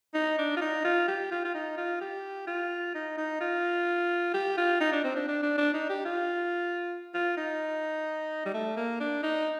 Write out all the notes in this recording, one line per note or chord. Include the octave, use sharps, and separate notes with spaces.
D#4
D4
F4
D#4
F4
G4
F4
F4
D#4
F4
G4
F4
D#4
D#4
F4
G4
F4
D#4
D4
C4
D4
D4
D4
D4
D#4
G4
F4
F4
D#4
G3
A3
A#3
D4
D#4